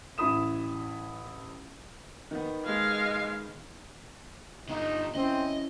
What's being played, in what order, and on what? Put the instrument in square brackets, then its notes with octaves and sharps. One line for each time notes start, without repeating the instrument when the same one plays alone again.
[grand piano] A1 E4 B5 D#6 E7
D#3 B3
[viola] G#3 F5
[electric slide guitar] D3 B3 [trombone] D#4
[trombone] C4 [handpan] C#4 E4 [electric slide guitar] D#5